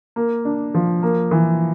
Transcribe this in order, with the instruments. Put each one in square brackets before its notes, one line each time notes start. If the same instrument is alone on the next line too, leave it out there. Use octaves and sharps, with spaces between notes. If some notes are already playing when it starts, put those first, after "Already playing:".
[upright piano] A#3
D4
F3
A#3
E3